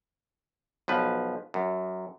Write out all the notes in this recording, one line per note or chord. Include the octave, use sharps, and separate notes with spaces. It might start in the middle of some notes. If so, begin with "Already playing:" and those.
B1 F3 B4
F#2